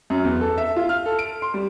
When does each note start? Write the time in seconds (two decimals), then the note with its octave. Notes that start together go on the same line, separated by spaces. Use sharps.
0.10 F#2
0.24 E2
0.41 A4
0.58 E5
0.76 F4
0.89 F6
1.06 A4
1.19 D7
1.42 C6
1.54 G3